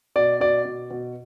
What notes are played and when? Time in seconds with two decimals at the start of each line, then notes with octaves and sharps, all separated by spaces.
0.16 B2 D5
0.40 B2 D5
0.65 B2
0.91 B2